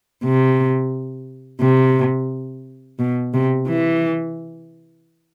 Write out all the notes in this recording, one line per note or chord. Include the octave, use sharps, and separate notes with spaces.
C3
C3
B2
C3
E3